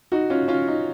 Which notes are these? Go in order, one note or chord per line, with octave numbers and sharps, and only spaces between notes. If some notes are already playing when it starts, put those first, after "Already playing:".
D#4 F#4
C#4 F4
C#4 F4
D#4